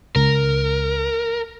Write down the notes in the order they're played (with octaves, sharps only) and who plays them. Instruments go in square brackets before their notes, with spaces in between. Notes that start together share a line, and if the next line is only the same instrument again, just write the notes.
[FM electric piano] C#2 [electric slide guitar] A#4